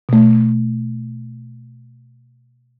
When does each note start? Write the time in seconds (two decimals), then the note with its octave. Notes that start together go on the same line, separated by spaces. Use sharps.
0.09 B2 A3